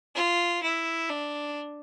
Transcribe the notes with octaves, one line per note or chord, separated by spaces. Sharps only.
F4
E4
D4